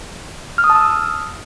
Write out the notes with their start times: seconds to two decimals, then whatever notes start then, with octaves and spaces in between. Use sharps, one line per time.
0.58 F6
0.64 D#6
0.70 A5
0.75 E6